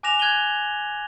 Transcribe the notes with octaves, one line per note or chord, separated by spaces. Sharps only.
G#5 D6 F#6 A#6 E7 F7
F#6 G#6 D#7 F#7 G7